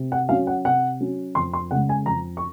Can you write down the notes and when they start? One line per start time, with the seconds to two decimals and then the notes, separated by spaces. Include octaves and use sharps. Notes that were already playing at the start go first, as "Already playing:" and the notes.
Already playing: C3
0.12 F#5
0.29 F#3 C#4 F5
0.47 F#5
0.65 C3 F#5
1.00 F#3 C#4
1.35 F2 C6
1.53 C6
1.71 C#3 G#3 F#5
1.89 G#5
2.06 F2 A#5
2.37 C#6